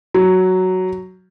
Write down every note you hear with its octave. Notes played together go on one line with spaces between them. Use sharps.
F#3